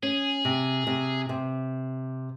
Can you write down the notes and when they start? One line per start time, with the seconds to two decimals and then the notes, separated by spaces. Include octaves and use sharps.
0.03 C#4 G#4
0.45 C3
0.87 C3
1.29 C3